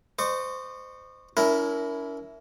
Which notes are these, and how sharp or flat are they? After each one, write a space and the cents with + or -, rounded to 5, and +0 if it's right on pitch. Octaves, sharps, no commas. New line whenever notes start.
C5 -20 D#5 -40 C#6 +0
C#4 +45 E4 +0 A#4 +0